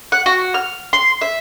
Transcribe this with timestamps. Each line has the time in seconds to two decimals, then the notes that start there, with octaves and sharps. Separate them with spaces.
0.12 F#5
0.26 F#4
0.54 F6
0.93 C6
1.21 E5